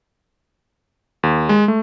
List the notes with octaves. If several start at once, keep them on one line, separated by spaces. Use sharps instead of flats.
D#2
G#3
A3